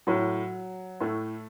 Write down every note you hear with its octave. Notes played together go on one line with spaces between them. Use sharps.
A2 F#3
A2 A3